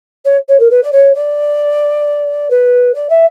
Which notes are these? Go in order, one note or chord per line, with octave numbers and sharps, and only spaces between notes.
C#5
C#5
A#4
B4
D5
C#5
D5
B4
D5
E5